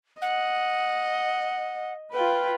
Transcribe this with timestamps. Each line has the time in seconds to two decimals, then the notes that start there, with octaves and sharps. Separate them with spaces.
0.22 D#5 F#5
2.14 F4 B4 G5